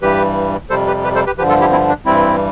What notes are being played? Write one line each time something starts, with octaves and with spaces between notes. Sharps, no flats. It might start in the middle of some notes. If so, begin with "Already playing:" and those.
G2 E3 G3 G4 B4
F2 C3 G3 A4 C5
G4 B4
G4 B4
A4 C5
G4 B4
G2 D3 F3 G4 B4
F4 A4
E4 G4
C4 E4
D4
G2 E3 G3 C4 E4